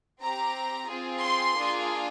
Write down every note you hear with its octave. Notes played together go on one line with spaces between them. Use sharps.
C4 G4 A#5
C4 F4 G#4
C6
A#3 D4 F4 G#4